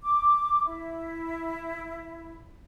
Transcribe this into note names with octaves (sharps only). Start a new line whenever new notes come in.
D6
E4